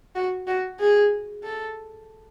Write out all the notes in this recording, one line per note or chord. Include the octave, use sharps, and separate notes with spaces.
F#4
F#4
G#4
A4